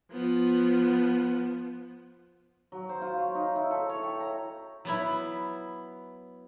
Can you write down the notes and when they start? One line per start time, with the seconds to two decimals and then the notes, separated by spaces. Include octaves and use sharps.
0.11 F3 B3
2.72 F#3
2.89 C5
3.02 F4
3.17 C#5
3.35 D#4
3.56 E4
3.71 A4
3.89 C#5
4.03 G5
4.20 A#5
4.85 F#3 B3 E4